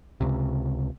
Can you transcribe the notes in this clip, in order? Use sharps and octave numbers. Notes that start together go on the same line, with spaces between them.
C#2 C3